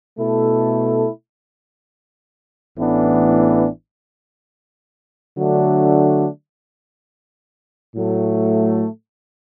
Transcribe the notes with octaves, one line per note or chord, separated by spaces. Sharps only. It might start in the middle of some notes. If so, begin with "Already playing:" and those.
B2 A3 E4 A4
A1 A2 E3 B3 D4
D3 F#3 A3 D4 F#4
A2 F#3 A3